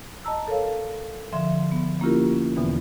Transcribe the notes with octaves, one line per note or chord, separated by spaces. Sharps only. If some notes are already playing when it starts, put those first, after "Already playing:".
D#5 A5 A#5 E6
A4 A#4 C#5 F5
D3 F3 E5 C6
B3
A#3 C#4 E4 F4 G4 A#4
E2 B2 D3 E3 B3